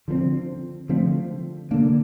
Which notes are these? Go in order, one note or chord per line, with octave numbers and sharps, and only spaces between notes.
D3 F3 A3 C4
D3 F3 A3 C4
D3 F#3 A#3 D4